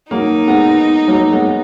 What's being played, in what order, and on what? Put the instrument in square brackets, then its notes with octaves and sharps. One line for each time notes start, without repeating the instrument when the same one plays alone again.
[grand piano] F#3 A#3 [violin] D#4
[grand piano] G#3 B3
F#3 A#3
G#3 B3